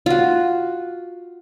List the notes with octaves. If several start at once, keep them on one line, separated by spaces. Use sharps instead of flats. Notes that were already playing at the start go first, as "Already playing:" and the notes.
F4 F#4